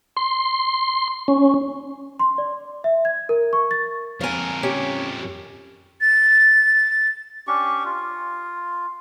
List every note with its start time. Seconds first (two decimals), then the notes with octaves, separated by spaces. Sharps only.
0.17 C6
1.28 C#4
2.20 C6
2.38 D5
2.84 E5
3.05 G#6
3.29 A#4
3.53 C#6
3.71 A6
4.21 F2 A#4 F5 G#5
4.63 C#4 G4
6.01 A6
7.47 C#4 D4 G4 C#6
7.85 F4